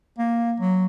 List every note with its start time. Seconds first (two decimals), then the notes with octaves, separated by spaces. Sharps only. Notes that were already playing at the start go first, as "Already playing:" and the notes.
0.18 A#3
0.60 F#3